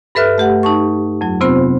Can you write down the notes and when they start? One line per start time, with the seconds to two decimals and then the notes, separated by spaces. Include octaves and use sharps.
0.15 G2 A4 B4 E5 F6 F#6
0.38 A3 G4 F#5
0.63 D#4 A5 C#6
1.21 F2 F#3
1.41 C3 B3 C4 F4 C5